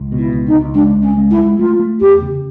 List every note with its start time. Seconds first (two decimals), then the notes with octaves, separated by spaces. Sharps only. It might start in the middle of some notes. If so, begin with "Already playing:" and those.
Already playing: C#2
0.12 B2
0.19 E4
0.33 C#2
0.47 D#4
0.54 C#2
0.74 G#3 D4
0.96 C#2
1.02 C#4
1.17 G#3
1.31 E4
1.38 G#3
1.59 A3 F4
1.79 A3
2.01 E2 G4
2.22 C#3